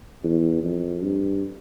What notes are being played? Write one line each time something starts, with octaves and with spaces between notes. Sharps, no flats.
E2
F2
G2